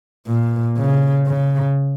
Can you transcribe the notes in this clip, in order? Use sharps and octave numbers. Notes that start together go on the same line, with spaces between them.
A#2
C#3
C#3